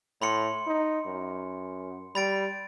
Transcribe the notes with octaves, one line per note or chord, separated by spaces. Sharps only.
A2 B5 C6 C#7
D#4
F#2
G3 B5 A6 D7